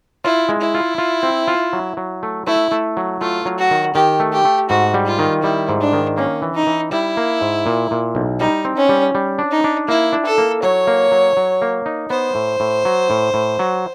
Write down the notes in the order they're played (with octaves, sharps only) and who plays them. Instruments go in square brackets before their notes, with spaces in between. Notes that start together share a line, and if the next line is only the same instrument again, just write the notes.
[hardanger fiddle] E4 [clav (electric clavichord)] F4
[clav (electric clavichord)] G#3
[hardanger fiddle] E4
[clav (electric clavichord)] F4
F4
C4
F4
F#3
F#3
A3
[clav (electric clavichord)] A3 [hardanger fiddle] E4
[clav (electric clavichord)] A3
F#3
[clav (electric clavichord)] A3 [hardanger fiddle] F4
[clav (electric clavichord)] F#3
[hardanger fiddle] F#4
[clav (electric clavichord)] D#3
[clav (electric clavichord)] D#3 [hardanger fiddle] G4
[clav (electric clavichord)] A3
[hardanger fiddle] G4
[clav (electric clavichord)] A3
[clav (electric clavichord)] G#2 [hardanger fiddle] F#4
[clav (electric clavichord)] G3
[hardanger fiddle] F4
[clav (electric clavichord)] D#3
[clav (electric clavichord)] G3 [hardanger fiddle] E4
[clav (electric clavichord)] G#2
[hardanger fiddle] D4
[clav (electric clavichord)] D#3
[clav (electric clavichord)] A#3 [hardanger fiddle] C#4
[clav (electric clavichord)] E3
[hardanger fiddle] D#4
[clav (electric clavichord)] E3
[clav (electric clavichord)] G3 [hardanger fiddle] E4
[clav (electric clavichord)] A#3
G#2
A#2
A#2
B1
[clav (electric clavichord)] G3 [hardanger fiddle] D#4
[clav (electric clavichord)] C4
[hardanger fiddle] C#4
[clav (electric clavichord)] G3
G3
D4
[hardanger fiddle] D#4
[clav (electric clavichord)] D4
[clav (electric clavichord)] A#3 [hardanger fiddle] E4
[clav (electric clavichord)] D4
[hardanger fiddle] A4
[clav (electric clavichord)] A#3
[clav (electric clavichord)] F#3 [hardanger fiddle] C#5
[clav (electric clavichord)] A#3
F#3
F#3
A#3
D#4
[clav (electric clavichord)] B3 [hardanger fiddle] C5
[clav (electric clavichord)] A2
A2
F#3
A2
A2
F#3